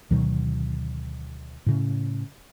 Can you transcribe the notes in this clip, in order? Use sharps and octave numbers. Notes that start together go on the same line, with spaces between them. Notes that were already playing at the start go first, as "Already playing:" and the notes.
D2 B2 D#3 F#3
A2 C#3